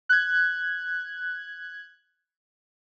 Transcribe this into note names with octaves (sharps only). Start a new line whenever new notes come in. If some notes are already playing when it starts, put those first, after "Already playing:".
F#6 G#6